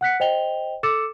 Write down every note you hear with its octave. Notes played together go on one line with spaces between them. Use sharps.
F#5 F#6 B6 C#7
C5 D#5 G5 F7 G7
A4 D6 E6 A6 C#7 E7